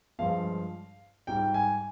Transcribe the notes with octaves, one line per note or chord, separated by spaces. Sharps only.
G2 F3 G#3 F5
G#2 G3 G5
G#5